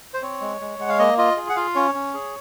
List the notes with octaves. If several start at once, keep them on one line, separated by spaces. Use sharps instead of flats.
C5
C4 C#5
G#3
G#3
G#3 F#5
F5
A#3 D#5
F4 D#5
G#4
F#5
F4 F5
C#4 C#5
C#4
G#4